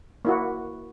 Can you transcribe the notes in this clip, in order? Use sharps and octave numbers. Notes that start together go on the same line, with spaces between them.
A#3 E4 F#4